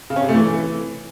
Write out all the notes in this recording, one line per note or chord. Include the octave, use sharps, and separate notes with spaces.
C#3
C#4
C3
A3
E3